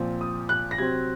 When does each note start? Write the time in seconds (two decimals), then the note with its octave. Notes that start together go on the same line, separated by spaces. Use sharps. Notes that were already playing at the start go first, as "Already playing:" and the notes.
Already playing: A#2 F3 C4
0.21 D#6
0.49 F#6
0.71 A#6
0.78 C3 F#3 C4 G#6